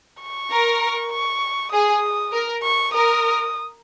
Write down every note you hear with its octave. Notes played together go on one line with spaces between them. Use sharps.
C#6
A#4
C#6
G#4 D#6
A#4
C#6
A#4 D#6